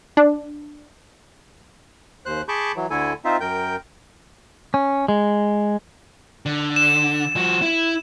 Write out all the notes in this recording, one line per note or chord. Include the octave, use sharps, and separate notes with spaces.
D4
D#2 C5 F#6
G#4 A5 B5 C#6 D6 G6
E3 F#3
D2 D3 A3 E4 A4 G#5
C4 D#4 F4 C5 E5
F#2 A#4 G5 G6
C#4
G#3
D3
E7
F3 F#4
E4